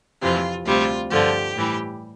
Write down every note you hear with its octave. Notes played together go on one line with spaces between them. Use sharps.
F2 C3 E3 F4
D2 C3 G3 F4
G2 D3 F3 G4
A2 E3 G3